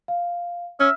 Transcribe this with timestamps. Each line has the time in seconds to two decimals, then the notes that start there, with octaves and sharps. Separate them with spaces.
0.08 F5
0.80 C#4 E5 F6